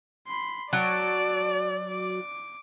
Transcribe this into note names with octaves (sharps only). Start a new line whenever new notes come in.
B5 C6
F#3 D5 A5 D7
D6